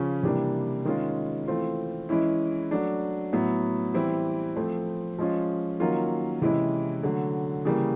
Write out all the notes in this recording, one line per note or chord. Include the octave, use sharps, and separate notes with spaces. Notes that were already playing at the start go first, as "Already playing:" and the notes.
Already playing: C#3 F3 C#4 F4
C3 E3 G3 A#3 D4
D#3 G#3 C#4 F4
E3 A3 C4 F4
E3 G#3 C#4 E4
F#3 A3 D4
A2 F#3 B3 E4
E3 G3 C4 E4
F3 A3 C4
F3 G#3 C#4 F4
D#3 F#3 A#3 C#4 F4
C3 E3 G#3 C#4 E4
D3 F#3 A3
C#3 E3 G3 A#3